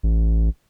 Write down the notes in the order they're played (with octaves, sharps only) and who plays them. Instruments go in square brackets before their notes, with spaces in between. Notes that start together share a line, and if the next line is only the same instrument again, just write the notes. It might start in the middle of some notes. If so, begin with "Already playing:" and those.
[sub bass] A1